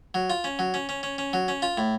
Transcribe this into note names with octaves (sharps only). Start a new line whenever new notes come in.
F#3
F4
C#4
F#3
C#4
C#4
C#4
C#4
F#3
C#4
F4
A2